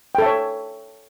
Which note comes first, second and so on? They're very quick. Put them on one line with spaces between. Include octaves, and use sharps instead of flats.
G5 A4 E5 C#5